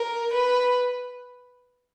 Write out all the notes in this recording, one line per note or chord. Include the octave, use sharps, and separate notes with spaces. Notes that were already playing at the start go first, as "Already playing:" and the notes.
Already playing: A#4
B4